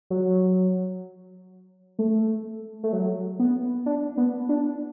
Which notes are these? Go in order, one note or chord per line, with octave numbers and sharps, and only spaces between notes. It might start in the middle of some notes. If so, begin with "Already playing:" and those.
F#3
A3
A3
F#3
B3
D4
B3
D4